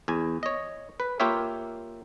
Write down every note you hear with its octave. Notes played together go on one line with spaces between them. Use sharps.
E2 G#5
C#5 D#5
B4
A#3 F4 G4 C#5 E5